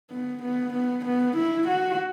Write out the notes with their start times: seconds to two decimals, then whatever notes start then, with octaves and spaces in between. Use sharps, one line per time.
0.11 B3
0.43 B3
0.74 B3
1.06 B3
1.37 E4
1.68 F#4